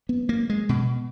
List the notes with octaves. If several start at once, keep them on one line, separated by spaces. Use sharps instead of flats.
B3
A#3
G#3
B2